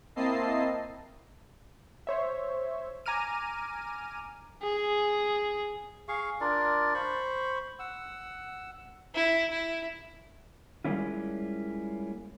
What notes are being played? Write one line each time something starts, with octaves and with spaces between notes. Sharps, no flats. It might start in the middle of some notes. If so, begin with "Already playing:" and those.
A#3 C4 E4 D#5 A5 C7
C5 C#5 E5
G#5 A#5 D6 F6 D#7
G#4
G#4 F5 C#6
D4 F4 A#4 D5
C5 B5 C#6
F#5 E6
E4
E4
G3 G#3 A#3 C#4 E4 F4